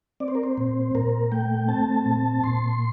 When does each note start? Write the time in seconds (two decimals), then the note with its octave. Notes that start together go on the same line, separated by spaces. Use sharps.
0.20 C4 D5
0.28 C5
0.35 A#4
0.43 C5
0.58 A#2
0.95 A#2 A#4
1.32 A3 G5
1.68 C4 A5
2.06 A#2
2.44 A#2 C6